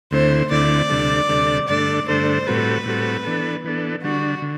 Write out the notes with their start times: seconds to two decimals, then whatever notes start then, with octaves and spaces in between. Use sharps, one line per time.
0.11 D2 D3 A3 C4 E4 C5
0.51 D2 D3 A3 C4 E4 D5
0.89 D2 C3 G3 D4 A4
1.29 D2 C3 G3 D4 A4
1.68 G2 D3 A3 D4 A4 D5
2.08 G2 D3 A3 D4 A4 C5
2.47 A2 G3 C4 F#4 A4 B4
2.86 A2 G3 C4 F#4 A4
3.25 E3 B3 D4 A4
3.64 E3 B3 D4 A4
4.03 D3 G3 D4 F#4
4.42 D3